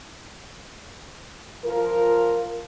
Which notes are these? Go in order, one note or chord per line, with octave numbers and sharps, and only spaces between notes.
F3 F4 A#4